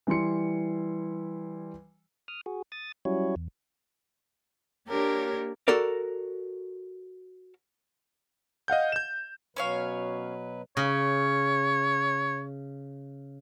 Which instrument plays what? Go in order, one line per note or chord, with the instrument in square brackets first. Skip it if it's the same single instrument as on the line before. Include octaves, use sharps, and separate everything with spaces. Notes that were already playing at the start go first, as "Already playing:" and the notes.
[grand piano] E3 G3 E4 C6 C#7
[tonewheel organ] D#6 F6
F#4 G#4
D#6 A6
F#3 G3 C#4 E4 F#4 C#5
E2
[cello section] A#3 D4 C#5 [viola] G4 A#4
[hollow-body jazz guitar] F#4 A4 A#4 D5
[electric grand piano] D#5 F5 F#5 G6
G6 E7
[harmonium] B2 F#3 B4 [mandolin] C#4 C#5 F5
[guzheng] C#3 [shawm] C#5